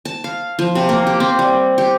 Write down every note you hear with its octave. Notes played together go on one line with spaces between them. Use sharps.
A5
F5
F3
C3
A#3
G4
C4
G3
G4